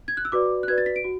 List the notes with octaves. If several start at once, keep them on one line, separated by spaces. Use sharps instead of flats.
G#6
F#6
E6
F#4 B4 D5 D6
F#6
F#4 B4 D5 G#6
A6
B6
D7
F#4